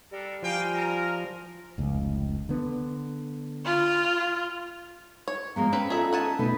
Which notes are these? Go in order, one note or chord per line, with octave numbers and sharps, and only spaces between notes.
G3 D4 A4 A#4
F3 A#3 F4 F5 G5 G#5
A#4
F1 C#2
D3 B3
F4
C#5
F3 G#3 A#3 B3
C4 C#4 B4
D#4 F4 G#4 A4 E5
F#5 G#5 A5
B2 A3 D#4 B4